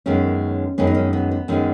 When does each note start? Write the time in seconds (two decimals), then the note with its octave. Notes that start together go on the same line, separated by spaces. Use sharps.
0.06 F#2 D#3 G#3 B3 C#4
0.78 F#2 D#3 G#3 B3 C#4
0.87 D#4
0.95 C#4
1.13 B3
1.31 B3
1.48 F#2 D#3 G#3 B3 C#4